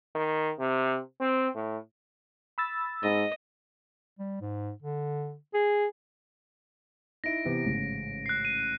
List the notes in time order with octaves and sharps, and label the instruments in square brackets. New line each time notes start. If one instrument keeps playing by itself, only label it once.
[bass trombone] D#3
C3
C4
A2
[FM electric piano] B5 E6 A6
[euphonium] G#2 [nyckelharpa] D#5
[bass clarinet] G3
G#2
D3
G#4
[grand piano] D#4 E4 [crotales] A#6 D7
[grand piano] C3 E3 B3
A1 G#2 C#3
[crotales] F#6 C7
D#7